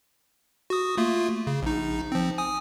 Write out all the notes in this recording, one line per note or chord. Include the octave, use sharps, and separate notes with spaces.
F#4 D#6
A3 A#3 F4
C#3
A#1 D#4
F3 C4
G#5 D#6